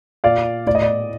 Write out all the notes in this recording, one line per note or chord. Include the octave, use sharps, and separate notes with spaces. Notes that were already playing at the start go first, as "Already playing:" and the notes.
A#2 D5 F5
A2 D5
D#5
D5